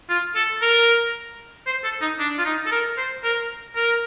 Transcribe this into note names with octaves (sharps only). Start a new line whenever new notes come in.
F4
A4
A#4
C5
A4
D#4
D4
F4
D#4
A4
A#4
C5
A#4
A#4